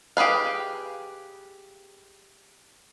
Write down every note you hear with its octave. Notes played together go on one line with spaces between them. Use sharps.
G4 G#4 B4 F5